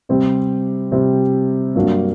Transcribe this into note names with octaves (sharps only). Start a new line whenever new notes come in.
C3 G3 C4 G4
C3 G3 C4 G4
G2 F#3 A#3 D4 F#4